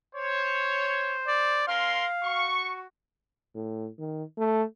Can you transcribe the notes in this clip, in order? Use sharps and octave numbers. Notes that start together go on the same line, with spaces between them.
C5 C#5
D5
C#4 A#4 F5 C6
F#4 C#6
A2
D#3
A3